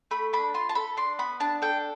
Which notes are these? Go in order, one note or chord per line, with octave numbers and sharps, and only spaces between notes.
A3 B5
D4 B5
F4 C6
A5
A4 B5
D4 C6
B3 B5
D4 A5
A4 G5